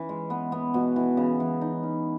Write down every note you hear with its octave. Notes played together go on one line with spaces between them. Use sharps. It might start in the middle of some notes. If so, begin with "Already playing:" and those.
Already playing: E3 C#4
G#3
B3
B3
B2
E3
C#3
E3
D#4
C#4